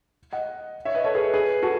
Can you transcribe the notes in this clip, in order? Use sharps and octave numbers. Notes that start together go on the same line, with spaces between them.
D#5 F#5
C#5 E5
B4 D#5
A4 C#5
G#4 B4
G#4 B4
F#4 A4